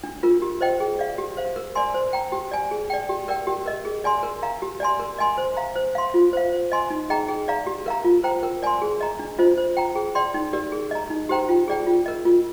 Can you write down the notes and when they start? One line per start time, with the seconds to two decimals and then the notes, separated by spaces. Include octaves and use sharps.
0.04 D4
0.23 F4 A#4
0.42 G4
0.61 C5 D#5 G5
0.80 G#4
0.99 D5 F5
1.18 G4
1.37 C5 F5
1.56 A#4
1.75 D5 G#5 C6
1.94 C5
2.13 G5 A#5
2.32 G4
2.51 D5 G#5
2.71 G#4
2.90 D5 G5
3.09 G4
3.28 A#4 D5 G5
3.47 G4
3.66 A#4 D#5
3.85 G#4
4.04 D5 G#5 C6
4.23 A#4
4.43 F5 A#5
4.62 G4
4.80 D5 G#5 C6
5.00 A#4
5.18 D#5 G#5 C6
5.38 C5
5.57 F5 A#5
5.76 C5
5.95 F5 C6
6.14 F4
6.33 C5 F5
6.52 C5
6.72 D#5 G#5 C6
6.90 D#4
7.10 G#4 D#5 G5 A#5
7.29 G#4
7.48 D5 F5 A#5
7.67 G4
7.86 A#4 F5 A#5
8.04 F4
8.23 C5 G5 A#5
8.43 A#4
8.63 D5 G#5 C6
8.82 G#4
9.01 D#5 A#5
9.19 D4
9.39 F4 C5 D#5
9.58 C5
9.77 G5 A#5
9.96 G#4
10.15 D5 G5 C6
10.34 D#4
10.53 G4 A#4 D5
10.72 G#4
10.91 D#5 A#5
11.10 D#4
11.29 G4 C5 G5 A#5
11.49 F4
11.68 G#4 D5 G5
11.87 F4
12.06 A#4 D#5
12.25 F4